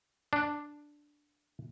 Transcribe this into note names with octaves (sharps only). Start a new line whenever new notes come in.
D4